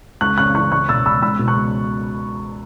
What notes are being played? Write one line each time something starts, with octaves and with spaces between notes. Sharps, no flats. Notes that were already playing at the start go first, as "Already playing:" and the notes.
C#2 C#6 F#6
C#3 C#6 F#6
E3 C#6 F#6
C#2 C#6 F#6
B2 E6 A6
C#2 B5 E6
C#2 B5 E6
B2
C#6 F#6
C#2